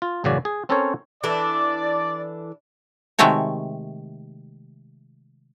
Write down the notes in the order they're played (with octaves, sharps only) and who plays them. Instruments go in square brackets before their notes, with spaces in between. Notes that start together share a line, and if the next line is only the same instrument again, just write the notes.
[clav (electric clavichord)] F4
A1 F#2 C#3 F#4 D5
G#4
C4 C#4 A4 A#4 C5 C#5
[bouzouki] E3 D4 A4 [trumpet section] D5
[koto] C3 D#3 G#3 A3 F#4 C#5